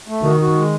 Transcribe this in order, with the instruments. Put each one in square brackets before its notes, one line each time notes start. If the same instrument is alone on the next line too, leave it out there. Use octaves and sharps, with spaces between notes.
[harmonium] A3
[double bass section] D#3 [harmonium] F#4
[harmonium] F#4
G#3